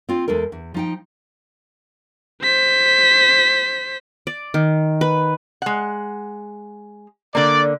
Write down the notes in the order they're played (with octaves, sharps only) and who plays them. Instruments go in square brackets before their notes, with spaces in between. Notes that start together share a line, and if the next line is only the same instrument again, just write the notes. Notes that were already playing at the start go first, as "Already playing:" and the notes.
[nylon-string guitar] C4 F4
E2 G#3 A4 A#4
E2
F3 D#4 G5
[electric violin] C5 B6
[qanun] D5
D#3
B4
[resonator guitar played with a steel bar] G#3 F#5
[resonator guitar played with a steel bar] D3 A#3 [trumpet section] D5